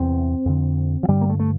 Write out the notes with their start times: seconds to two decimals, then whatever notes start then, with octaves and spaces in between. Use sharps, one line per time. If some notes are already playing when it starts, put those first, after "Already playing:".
Already playing: E2 C3 C4
0.45 F2 D3
1.03 F3
1.08 G2 D3 G3
1.21 A#3
1.30 A3
1.40 A3